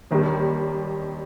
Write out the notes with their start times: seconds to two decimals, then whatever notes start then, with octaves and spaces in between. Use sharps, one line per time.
0.11 D#2 D#3 G3